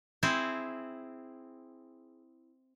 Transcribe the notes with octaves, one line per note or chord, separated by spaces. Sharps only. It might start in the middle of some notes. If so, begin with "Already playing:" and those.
C4 E4 G#4